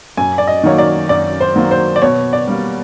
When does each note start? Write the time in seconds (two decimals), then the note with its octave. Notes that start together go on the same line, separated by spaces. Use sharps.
0.17 F#2 G#5
0.38 D5
0.47 D#5
0.63 D#3 F#3 A#3 C#5
0.78 D5
1.09 F#2 D5
1.41 C5
1.56 D#3 F#3 A#3
1.71 C5
1.96 D5
2.02 B2 C#5
2.33 D5
2.47 G3 A#3